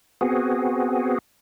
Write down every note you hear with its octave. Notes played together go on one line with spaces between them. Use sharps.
B3 C4 F#4 G#4